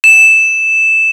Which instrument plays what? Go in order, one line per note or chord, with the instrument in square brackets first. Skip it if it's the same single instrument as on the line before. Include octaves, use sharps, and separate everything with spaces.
[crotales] E7